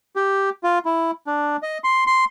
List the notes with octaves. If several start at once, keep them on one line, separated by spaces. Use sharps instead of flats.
G4
F4
E4
D4
D#5
C6
C6